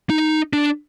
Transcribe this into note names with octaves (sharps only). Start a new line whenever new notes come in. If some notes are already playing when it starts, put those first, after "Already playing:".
D#4
D4